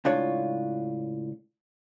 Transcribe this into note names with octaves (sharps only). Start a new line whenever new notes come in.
C#2 A2 D4 F4 C#5